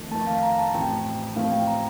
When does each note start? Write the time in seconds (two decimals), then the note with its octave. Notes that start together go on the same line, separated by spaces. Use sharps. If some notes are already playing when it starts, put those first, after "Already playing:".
Already playing: F2 D#3 A3
0.11 F2 D#3 A3 A5
0.27 F5
0.43 A#5
0.58 A5
0.74 A1 A2 F3 A3 C4 G5
1.36 A1 A2 F3 A3 C4 F5
1.52 G5
1.68 A#5